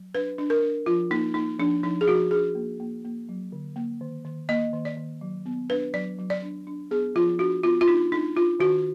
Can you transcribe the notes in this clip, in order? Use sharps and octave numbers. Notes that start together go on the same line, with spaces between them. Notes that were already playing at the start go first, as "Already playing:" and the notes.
Already playing: F#3
D4 B4
D4
A#4
D4
F3 F4
A#3 D#4
A#3 D#4
F3 D4
F3 D#4
G#4
F3 F#4
D4 G#4
A#3
A#3
A#3
F#3
D3
A#3
D#3
D#3
A#3 D#5
D#3
D5
D#3
F#3
B3
D4 B4
F#3 D5
F#3
D5
D4
D4
B3 G#4
F3 F4
D4 F#4
B3 F4
F4
D4 D#4
D4 D#4
D4 F4
D#3 F#4